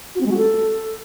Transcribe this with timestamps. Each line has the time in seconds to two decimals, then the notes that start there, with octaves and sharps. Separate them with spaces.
0.15 F#4
0.21 C4
0.26 G#3
0.31 F#4
0.37 A4